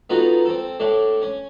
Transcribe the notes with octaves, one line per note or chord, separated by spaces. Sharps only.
B3 D#4 F4 F#4 A4
C4 A4
A2 A3 D4
C#4